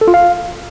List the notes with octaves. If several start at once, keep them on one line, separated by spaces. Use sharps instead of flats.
A4
F4
F5